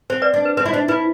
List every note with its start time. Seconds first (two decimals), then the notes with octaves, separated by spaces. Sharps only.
0.10 C4 C5
0.22 B4 D5
0.34 D4
0.45 B4
0.57 C4 B4
0.66 E4
0.73 D4 C5
0.88 E4 B4